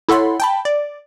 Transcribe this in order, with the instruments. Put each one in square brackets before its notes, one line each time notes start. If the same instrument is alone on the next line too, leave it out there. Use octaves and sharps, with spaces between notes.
[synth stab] E4 A4 C#5 F#5 B5 C6
G5 A5 B5
D5